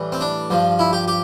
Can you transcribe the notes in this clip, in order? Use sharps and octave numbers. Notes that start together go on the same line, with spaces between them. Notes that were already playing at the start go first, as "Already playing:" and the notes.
Already playing: A2 E3 G3
C4
D4
G2 F3
E4
G4
G4